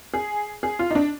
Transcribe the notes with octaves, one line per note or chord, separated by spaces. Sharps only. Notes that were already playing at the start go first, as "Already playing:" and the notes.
G#4
G#4
F4
D#4
D4